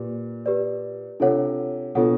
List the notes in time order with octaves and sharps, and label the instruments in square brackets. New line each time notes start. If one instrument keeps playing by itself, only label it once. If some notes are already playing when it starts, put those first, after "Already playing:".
Already playing: [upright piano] A#2 [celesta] G4 B4 D5
[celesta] G4 B4 D5
[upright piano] C3 [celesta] D4 F4 A4 C#5 F#5
[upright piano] B2 [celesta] D4 F4 A4 C#5 F#5